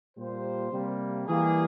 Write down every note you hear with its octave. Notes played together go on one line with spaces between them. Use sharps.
A#2 G3 A#3 C5
C3 G3 A#3
E3 G3 A#3 G#4